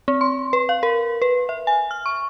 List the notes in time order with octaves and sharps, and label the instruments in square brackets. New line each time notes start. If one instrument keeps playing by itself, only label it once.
[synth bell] C4
C6
B4
F5
A#4
B4
E5
G#5
F6
C#6